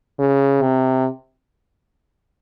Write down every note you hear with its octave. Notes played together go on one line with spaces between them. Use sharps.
C#3
C3